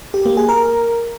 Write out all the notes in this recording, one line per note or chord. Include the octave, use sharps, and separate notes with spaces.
G4
A#3
G#4
A#4